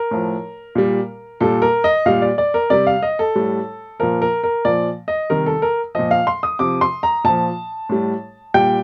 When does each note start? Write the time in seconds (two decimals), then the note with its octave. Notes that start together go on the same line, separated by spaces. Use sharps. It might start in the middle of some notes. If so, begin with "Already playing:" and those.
Already playing: A#4
0.11 A2 F3
0.75 A#2 G3
1.41 A#2 G3 A4
1.62 A#4
1.84 D#5
2.06 A#2 G3 F5
2.22 D5
2.38 D5
2.54 A#4
2.70 C3 G3 D5
2.87 F5
3.03 D#5
3.19 A4
3.35 A2 G3
4.00 A#2 F3 A#4
4.22 A#4
4.43 A#4
4.65 A#2 F3 D5
5.08 D#5
5.30 C3 D#3 G3 A#4
5.46 A4
5.62 A#4
5.95 A#2 F3 D#5
6.11 F5
6.27 C6
6.43 D#6
6.59 C3 F3 D6
6.81 C6
7.03 A#5
7.24 A#2 F3 A5
7.89 A2 G3
8.54 A#2 G3 G5